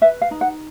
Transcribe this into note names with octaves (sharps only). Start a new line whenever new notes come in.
B4 E5
F5
D#4
F#5